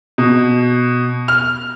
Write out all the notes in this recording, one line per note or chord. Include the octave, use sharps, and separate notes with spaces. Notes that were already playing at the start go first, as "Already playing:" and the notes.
B2
F6